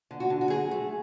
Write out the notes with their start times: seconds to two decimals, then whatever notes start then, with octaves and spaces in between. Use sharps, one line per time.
0.11 D3
0.20 F#4
0.30 D3
0.41 F#4
0.50 F#3 G#4
0.71 A3